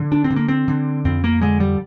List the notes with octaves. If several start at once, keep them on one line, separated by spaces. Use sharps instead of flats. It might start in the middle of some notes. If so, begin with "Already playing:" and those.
Already playing: D3
D4
C4
D3
A#3
C4
D3
F2 C4
A#3
D3 G#3
G3